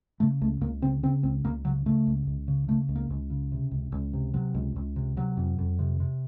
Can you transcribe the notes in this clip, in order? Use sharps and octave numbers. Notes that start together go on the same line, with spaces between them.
C#3 A3
C#2 A3
C#2 A#3
C#3 C4
C#3 C4
C#2 C4
C#2 A#3
C#3 F#3
C#3 A3
C#2
C#2
C#3
C#3 A3
C#2
A#3
C#2
C#3
C3
C#2
C#2
C3
C3 F#3
C#2
C#2
C3
C3 F#3
F2
F2
C3
C3